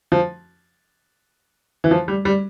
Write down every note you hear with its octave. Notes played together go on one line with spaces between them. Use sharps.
F3
E3
F3
G3
G3